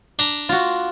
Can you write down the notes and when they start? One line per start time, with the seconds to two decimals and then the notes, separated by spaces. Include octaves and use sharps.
0.19 D4 A#5
0.49 F4 F#4